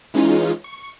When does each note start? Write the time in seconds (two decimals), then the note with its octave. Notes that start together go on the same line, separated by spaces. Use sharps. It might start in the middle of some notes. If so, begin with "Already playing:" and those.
0.14 E3 G#3 C#4 D#4 F4
0.64 C#6